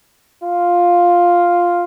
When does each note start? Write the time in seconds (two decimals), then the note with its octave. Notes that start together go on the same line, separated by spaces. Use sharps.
0.43 F4